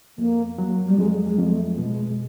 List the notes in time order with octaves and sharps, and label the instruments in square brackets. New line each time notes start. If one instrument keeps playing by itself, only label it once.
[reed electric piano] F2 [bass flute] A#3
[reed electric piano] F#3
[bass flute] G3
[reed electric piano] F2 [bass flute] G#3
[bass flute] G#3
[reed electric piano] F2
[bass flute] A3
[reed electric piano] B2 [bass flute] G#3